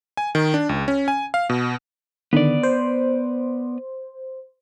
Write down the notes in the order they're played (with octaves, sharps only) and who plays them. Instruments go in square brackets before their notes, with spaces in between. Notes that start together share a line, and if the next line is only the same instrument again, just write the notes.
[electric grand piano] G#5
D#3
D4
C#2
C#4
G#5
F5
B2
[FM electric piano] D3 D#3 [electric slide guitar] B3 D5
[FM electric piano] C5